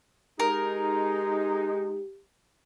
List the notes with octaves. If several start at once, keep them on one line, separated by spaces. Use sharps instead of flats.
G#3 D#4 G4 A#4